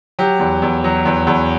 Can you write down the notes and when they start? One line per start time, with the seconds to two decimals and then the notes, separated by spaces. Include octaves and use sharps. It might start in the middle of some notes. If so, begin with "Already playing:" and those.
0.19 F#3 G4
0.39 E2
0.62 E2
0.84 F#3
1.05 E2
1.27 E2